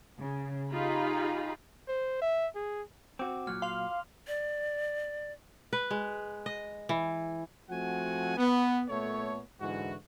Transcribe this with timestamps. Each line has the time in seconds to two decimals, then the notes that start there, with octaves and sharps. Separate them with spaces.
0.20 C#3
0.71 D#4 F4 G4 G#4 A#5 B5
1.88 C5
2.21 E5
2.55 G#4
3.19 C4 F#4 D6
3.47 A#2 F#3 F6
3.62 F5 C6 F7
4.27 D5
5.73 B4
5.91 G#3
6.46 D#5
6.89 E3
7.70 F3 A3 C4 F#4 F#5 G#5
8.37 B3
8.89 A#2 A3 B3 A4 C#5
9.61 G#2 D3 E3 E4 F#4